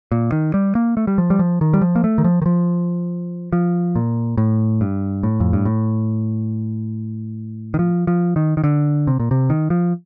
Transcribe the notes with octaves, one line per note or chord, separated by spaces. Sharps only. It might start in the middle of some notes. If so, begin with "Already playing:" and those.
A#2
D#3
G3
A#3
A3
G3
F3
G3
F3
D#3
G3
F3
A#3
A3
D#3
F3
D#3
F3
F3
A#2
A2
G2
A2
F2
G2
A2
D#3
F3
F3
D#3
D#3
D3
C3
A#2
C3
D#3
F3